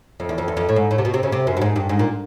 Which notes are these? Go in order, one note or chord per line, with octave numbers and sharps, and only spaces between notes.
F2
E2
F2
E2
F2
A2
G#2
A2
C3
B2
C3
C#3
C3
F#2
G2
G#2
G2
G#2
A#2